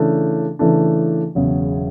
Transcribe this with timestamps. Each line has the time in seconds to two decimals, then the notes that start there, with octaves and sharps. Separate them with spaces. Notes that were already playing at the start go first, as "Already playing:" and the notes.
Already playing: C#3 E3 A3 D4
0.59 C#3 E3 A3 D4
1.35 E1 E2 C#3 F#3